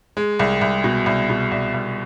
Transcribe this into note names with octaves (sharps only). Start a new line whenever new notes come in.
G#3
C2
C2
B2
C2
B2
C2
C2